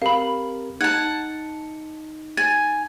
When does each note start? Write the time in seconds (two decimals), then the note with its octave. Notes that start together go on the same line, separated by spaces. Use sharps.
0.02 C4 G4 A#4 F5 B5
0.81 D#4 F#5 A5 G#6
2.37 G#5 A6